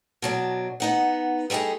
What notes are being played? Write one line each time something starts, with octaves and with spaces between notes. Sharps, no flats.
B2 F#3 D4
B3 D#4 F#5
G3 A3 D#4 G4 G#4